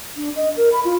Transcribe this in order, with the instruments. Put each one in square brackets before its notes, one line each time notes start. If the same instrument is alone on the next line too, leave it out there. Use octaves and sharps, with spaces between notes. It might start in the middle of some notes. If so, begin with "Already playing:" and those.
[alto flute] D4
D#5
A#4
B5
F4